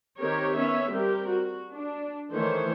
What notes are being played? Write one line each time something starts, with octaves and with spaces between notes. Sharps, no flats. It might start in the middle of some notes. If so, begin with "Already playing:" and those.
D#3 C4 G4 A#4 C#5
B3 C#4 C#5 E5
G3 C4 G4 A#4
F#4
D4
D#3 E3 A3 C5 C#5